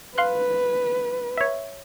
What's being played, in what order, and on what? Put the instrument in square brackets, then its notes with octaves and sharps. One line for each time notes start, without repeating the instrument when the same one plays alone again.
[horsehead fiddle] B4 [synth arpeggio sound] F5 C6 F#6
[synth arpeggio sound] C#5 E5